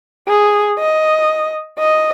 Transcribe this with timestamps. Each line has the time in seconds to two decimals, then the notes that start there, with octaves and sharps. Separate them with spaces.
0.28 G#4
0.79 D#5
1.79 D#5